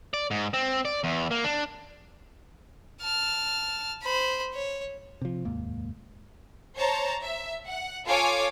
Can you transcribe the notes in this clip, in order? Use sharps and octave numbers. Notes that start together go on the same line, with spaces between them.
D5
G#2
C4
D5
E2
A#3
D4
A5 F6
C5 B5
C#5
C3 F3
F1 D#2 G#2 A#3
C5 C#5 A5 A#5
E5
F#5
F4 A4 C#5 F5 G#5 D6